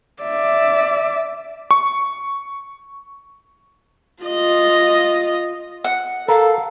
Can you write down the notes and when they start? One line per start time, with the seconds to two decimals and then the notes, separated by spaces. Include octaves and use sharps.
0.23 D5 E5
1.71 C#6
4.23 F4 D#5
5.85 F#5
6.28 A4 A#4 F5